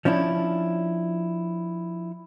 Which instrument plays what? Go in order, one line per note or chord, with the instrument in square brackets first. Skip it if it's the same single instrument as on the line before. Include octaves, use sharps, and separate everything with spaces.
[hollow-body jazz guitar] F3 C#4 D4 E4